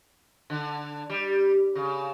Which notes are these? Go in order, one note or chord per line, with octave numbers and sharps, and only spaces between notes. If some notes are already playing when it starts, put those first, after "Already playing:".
D3
G3
C#3